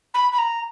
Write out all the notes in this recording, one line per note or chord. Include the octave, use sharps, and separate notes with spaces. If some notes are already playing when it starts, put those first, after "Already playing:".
B5
B5
A#5